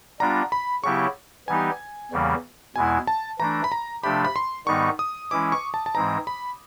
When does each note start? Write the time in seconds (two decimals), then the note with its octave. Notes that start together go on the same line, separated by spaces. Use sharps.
0.20 G3 B3 D4 F4 A#5
0.52 B5
0.84 C#3 F#3 B3 E4 G4 C#6
1.48 E3 G3 B3 D#4 G4 G#5
2.12 E2 C#3 E3 G3 A#3
2.76 E2 B2 G#3 B3 E4 G#5
3.07 A5
3.39 E3 A3 D4 A#5
3.64 B5
3.72 A#5
4.03 C3 F3 A3 D4 G4 B5
4.25 B5
4.36 C6
4.67 G#2 D#3 G3 B3 D#4 C#6
4.99 D#6
5.30 E3 G#3 C#4 E4 D6
5.52 C#6
5.74 A5
5.86 A5
5.95 G#2 E3 G#3 C4 A#5
6.27 B5